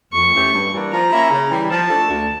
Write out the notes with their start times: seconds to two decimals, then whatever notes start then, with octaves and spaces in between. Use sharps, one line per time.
0.13 F2 C#6
0.33 E3 A3 C#4 G4
0.53 G2
0.72 E3 G3 A#3 D4
0.92 F3 A#5
1.11 A#3 C#4 E4
1.31 C#3
1.51 E3 G3
1.70 F3 A5
1.89 A3 D4 A4
2.09 D2